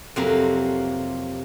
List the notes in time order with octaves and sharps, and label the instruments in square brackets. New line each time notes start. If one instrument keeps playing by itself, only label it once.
[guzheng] F2 C3 F#3 A#3